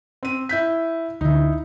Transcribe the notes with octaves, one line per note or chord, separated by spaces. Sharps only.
C4 D#7
E4 G6 B6
D2 D3 D#4 E4